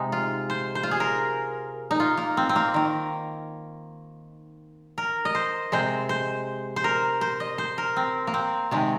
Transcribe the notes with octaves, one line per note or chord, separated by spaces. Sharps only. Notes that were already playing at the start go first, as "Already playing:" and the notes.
Already playing: C3 G#3 D#4
F4
C5
C5
F4
G#4
A#4
D#4
F4
A#3
C4
C4
A#3
D#3 A#3
A#4
D#5
C5
C3 G#3 C5
C5
C5
A#4
C5
D#5
C5
A#4
C4
A#3
C4
C3 D#3 G#3